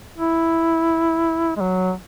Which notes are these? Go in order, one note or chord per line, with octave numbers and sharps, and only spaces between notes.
E4
G#3
F#3